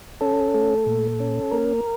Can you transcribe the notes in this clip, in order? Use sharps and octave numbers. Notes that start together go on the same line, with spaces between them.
C#4 A4
A3
A#2
C#4
A#3 A#4